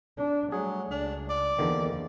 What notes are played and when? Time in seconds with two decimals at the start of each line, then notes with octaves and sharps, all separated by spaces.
0.17 D4
0.52 F#3 G3 A3 G#4
0.91 C#2 D4
1.29 D5
1.59 E2 D3 D#3 F3 A#3